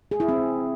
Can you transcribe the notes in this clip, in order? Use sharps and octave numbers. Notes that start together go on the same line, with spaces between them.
G#4
E4
C4